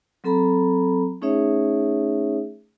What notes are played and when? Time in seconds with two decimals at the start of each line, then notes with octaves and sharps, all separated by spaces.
0.24 F#3 C4 A4 A#5 B5
1.21 A3 C#4 D#4 G#4 C#5 E5